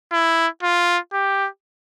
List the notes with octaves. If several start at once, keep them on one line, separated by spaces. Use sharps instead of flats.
E4
F4
G4